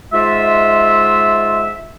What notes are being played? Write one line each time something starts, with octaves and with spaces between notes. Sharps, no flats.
G#2 G#3 F4 E5